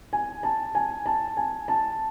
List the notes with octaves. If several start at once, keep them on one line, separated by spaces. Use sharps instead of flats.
G#5
A5
G#5
A5
G#5
A5